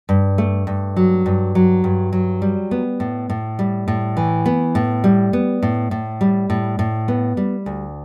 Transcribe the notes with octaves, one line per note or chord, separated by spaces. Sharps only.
G2
A3
G2
F#3
G2
F#3
G2
F#3
G3
B3
A2
A2
G3
A2
E3
B3
A2
G3
B3
A2
A2
G3
A2
A2
B3
G3
D2